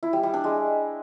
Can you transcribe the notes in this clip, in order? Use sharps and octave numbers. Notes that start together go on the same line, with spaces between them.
E4
G3
G3
D4
G#3